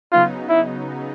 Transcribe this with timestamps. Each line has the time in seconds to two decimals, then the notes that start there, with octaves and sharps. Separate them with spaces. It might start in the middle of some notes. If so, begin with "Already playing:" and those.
0.12 C#3 F#3 B3 D#4 F4
0.49 E4